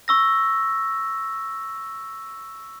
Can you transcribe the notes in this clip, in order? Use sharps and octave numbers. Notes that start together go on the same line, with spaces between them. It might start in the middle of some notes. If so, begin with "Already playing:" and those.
C#6 E6 A#6